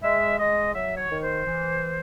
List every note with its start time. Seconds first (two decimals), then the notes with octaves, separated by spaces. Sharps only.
0.03 G#3 E5
0.38 G#3 D#5
0.73 F#3 E5
0.97 C#5
1.08 D#3
1.21 C5
1.44 E3